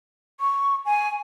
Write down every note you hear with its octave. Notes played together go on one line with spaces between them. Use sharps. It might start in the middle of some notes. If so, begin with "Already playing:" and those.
C#6
G#5